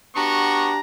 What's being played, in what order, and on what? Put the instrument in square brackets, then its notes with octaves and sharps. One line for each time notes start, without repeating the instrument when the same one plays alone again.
[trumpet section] B3 F#4 C#6 [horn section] D4 G4 A#5